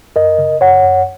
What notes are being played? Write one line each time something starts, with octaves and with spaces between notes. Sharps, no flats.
F#2 A#4 D#5
C#3
F#2 C#5 F#5
F#2